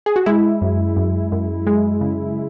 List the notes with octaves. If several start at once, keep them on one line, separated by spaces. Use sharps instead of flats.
G#4
F#4
G#3 E4
F#2
F#2
F#2
G#3
C#3